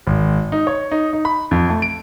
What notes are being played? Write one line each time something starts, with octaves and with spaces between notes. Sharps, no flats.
G#1
D#4
C#5
D#4
D#4
B5
F2
A3
D7